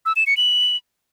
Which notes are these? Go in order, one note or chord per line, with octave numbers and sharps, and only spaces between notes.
E6
E7
C#7
F#7